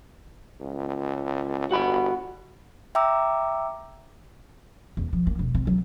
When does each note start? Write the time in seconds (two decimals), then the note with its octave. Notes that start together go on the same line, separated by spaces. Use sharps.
0.61 C#2
1.71 G1 F#4 F#5 B5
2.95 E5 G5 A#5 D6 E6
4.97 E2
5.13 F3
5.27 A#3
5.39 E1
5.55 C4
5.67 F#3